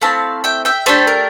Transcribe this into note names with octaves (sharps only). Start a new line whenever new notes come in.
A3 C4 E4 F5 A5
E5 G5
E5 G5
A3 D4 G4 A4 C5
A#4